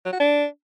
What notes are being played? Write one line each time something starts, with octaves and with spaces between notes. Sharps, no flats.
F#3
F#4
D4